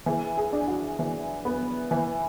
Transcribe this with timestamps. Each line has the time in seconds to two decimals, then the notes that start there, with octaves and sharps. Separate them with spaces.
0.06 E3 G#4
0.37 G#4
0.53 D4
0.68 F#4
0.99 E3
1.45 B3
1.91 E3